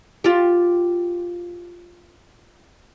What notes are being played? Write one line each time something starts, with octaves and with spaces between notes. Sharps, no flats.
F4 G4